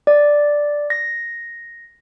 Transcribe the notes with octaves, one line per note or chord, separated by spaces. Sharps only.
D5
A#6